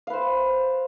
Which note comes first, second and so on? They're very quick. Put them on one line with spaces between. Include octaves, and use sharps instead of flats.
F5 B4 C5